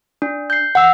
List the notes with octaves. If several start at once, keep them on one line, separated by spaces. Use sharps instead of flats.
D4
G6 C7
F#5 E6